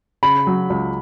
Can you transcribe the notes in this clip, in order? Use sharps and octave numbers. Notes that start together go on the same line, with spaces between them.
C#3 B5
F#3
C#2